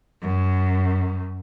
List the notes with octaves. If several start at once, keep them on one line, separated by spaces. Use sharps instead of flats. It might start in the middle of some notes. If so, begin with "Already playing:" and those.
F#2